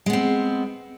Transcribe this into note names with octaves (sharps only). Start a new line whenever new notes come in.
G#3 B3 C4